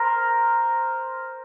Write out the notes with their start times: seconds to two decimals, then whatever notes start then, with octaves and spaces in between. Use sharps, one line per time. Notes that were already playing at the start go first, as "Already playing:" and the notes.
Already playing: A#4 C5